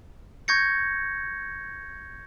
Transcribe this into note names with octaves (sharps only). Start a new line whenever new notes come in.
C#6 G6 G#6 A#6 C#7